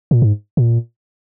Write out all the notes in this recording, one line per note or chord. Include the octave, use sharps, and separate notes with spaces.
A#2
G#2
A#2